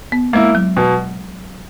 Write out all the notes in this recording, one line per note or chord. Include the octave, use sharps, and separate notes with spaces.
B3
G#3 A#3 E4
F#3
B2